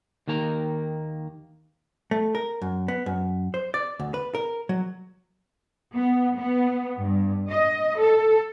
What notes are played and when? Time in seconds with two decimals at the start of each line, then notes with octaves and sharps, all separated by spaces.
0.28 D#2 D#3 A#3 A#5
2.11 A3
2.35 A#4
2.62 F#2
2.88 B3
3.06 F#2
3.54 C5
3.74 D5
4.00 D2
4.14 B4
4.35 A#4
4.69 F#3
5.95 B3
6.39 B3
6.98 G2
7.50 D#5
7.99 A4